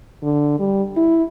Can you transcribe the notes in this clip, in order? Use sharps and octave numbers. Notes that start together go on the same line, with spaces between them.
D3
G3
E4